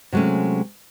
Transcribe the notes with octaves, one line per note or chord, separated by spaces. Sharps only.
C3 F#3 G#3 A3 C#4